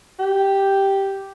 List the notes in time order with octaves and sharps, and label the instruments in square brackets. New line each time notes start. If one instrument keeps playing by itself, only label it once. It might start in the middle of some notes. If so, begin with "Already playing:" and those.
[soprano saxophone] G4